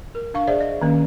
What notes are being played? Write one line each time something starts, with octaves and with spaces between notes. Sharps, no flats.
A#4
D4 F5 C#6
G#4 C5 D5 E5
D#5
D#3 A#3 C#4